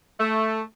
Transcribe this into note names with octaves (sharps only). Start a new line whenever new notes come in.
A3